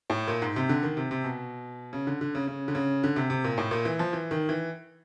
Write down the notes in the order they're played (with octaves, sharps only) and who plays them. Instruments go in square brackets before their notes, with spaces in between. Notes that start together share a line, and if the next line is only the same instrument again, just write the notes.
[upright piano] A2
A#2
G#2
C3
D3
D#3
C3
C3
B2
C#3
D3
D3
C#3
C#3
D3
C#3
D3
C3
C3
A#2
A2
A#2
E3
F3
E3
D#3
E3